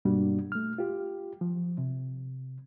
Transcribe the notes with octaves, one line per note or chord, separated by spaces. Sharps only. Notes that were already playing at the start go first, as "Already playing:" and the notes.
G2 B2 G3 A#3 D4 F#4
A3 F6
F4 G4
F3
C3